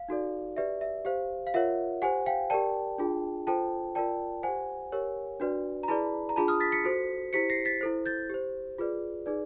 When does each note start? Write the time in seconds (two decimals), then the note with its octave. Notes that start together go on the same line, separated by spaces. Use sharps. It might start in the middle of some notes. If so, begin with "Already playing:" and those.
Already playing: F5
0.09 D#4 F#4 A4 D5
0.57 G4 B4 D5 E5
0.81 E5
1.05 G4 C5 F5
1.47 F5
1.54 F4 A#4 C#5 E5 F#5
2.02 G4 C5 F#5 G#5
2.26 F5 G5
2.50 G4 A#4 D5 G5 A5
2.98 D4 F4 G#4
3.47 F4 A4 C5 G5 A5
3.95 F4 A#4 D5 G5 A5
4.43 G4 C5 F#5 G#5
4.92 G4 A#4 C#5
5.40 D4 F#4 B4 D5
5.83 A#5
5.88 E4 G#4 B4 D5 A5 B5
6.29 A#5
6.36 D4 F4 G#4 A5 B5
6.48 D#6 F6
6.60 A6 B6
6.72 B6 C#7
6.84 F#4 A4 C5
7.33 E4 G4 C5 B6 C#7
7.50 A#6 C7
7.65 A6 B6
7.81 E4 A4 C5
8.06 G6 A6
8.30 G4 C5
8.78 F4 G#4 B4 D5
9.26 D#4 G#4 B4 D5